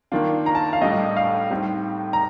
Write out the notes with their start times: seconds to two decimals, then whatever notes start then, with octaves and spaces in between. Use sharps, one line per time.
0.12 D#3 A#3 D4 F4
0.46 A#5
0.55 A5
0.73 F5
0.81 A2 G3 D4 A4 D#5
1.17 F5
1.51 A2 G3 C4 D#4 G4
2.13 A#5